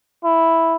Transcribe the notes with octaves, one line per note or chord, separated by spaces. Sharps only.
E4